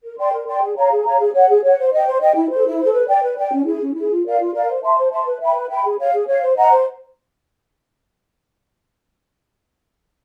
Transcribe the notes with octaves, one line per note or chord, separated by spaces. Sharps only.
A#4
D5 G5 C6
A#4
D5 G5 C6
G#4
C#5 F5 A#5
G#4
C#5 F5 A#5
G#4
C#5 F#5
G#4
C#5 F#5
C5
D#5 G5
C5
D#5 G5
E4
A4 C5
E4
A4 C5
B4
D5 G5
B4
D5 G5
C#4
E4 G#4
C#4
E4 G#4
F4
A#4 D5 F5
F4
A#4 D5 F5
C5
E5 A5 C6
C5
E5 A5 C6
B4
E5 G5 B5
B4
E5 G5 B5
G#4
C#5 F5
G#4
C#5 F5
C5
D#5 F#5 A#5
C5